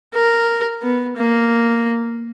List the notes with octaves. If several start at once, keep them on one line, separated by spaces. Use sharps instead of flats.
A#4
B3
A#3